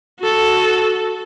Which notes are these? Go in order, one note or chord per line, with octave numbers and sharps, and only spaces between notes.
F#4 A4